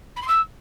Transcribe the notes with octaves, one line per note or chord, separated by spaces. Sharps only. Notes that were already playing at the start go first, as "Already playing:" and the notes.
B5
C6
E6